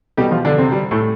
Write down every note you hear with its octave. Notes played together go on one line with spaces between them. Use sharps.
B2 G3 G4
F3 F4
D3 D4
C3 C4
G3
A2 A3